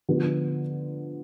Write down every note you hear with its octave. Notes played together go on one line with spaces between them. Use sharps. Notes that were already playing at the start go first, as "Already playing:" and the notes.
D3 F3 B3